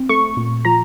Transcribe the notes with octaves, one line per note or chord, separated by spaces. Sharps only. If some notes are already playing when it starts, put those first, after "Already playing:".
Already playing: C4
A3 C#6
A#2
F3 A#5